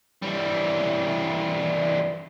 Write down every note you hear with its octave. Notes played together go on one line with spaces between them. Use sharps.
E3 G3